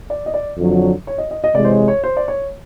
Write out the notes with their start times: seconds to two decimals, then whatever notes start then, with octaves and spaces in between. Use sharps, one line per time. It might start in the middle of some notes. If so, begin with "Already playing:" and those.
0.10 D5
0.26 D#5
0.34 D5
0.58 F2 D3 F#3
1.07 C#5
1.18 D#5
1.31 D#5
1.44 D#5
1.55 C3 E3 G#3 D5
1.65 C5
1.72 C#5
1.88 C#5
2.04 C5
2.17 D5
2.28 C#5